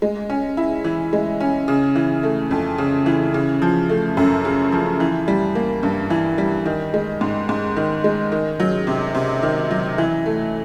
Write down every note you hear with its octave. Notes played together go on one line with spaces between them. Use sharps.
G#3
C#4
E4
E3
G#3
C#4
C#3
E3
A3
F2
C#3
E3
C#3
F3
A3
F#2
C#3
F3
E3
G3
A#3
G2
E3
G3
D#3
G#3
G#2
G#2
D#3
G#3
D#3
F#3
C3
C3
D#3
F#3
E3
A3